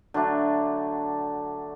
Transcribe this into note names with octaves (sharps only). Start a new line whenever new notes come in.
D3 F#3 A3 D4